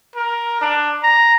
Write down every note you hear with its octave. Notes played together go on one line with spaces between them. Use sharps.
A#4
D4
A#5